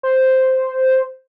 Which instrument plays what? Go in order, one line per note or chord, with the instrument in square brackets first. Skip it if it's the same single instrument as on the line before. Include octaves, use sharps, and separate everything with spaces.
[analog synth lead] C5